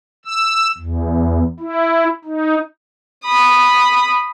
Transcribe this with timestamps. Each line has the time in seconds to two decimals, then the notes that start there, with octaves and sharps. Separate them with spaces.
0.25 E6
0.77 E2
1.59 E4
2.25 D#4
3.24 B5 D#6